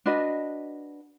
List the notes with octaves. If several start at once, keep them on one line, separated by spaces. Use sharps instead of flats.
D4 F#4 B4 D#5